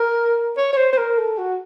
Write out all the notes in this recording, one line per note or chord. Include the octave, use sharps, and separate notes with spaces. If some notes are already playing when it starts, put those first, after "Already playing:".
Already playing: A#4
C#5
C#5
C5
C5
A#4
A4
F#4